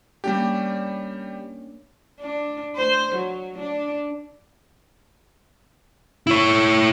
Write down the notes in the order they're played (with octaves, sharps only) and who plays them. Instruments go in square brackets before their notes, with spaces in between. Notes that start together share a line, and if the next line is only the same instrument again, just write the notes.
[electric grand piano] G3 G4 [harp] A#3 C#4 D4
[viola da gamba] D4
C5
F#3
D4
[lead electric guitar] E4 C#5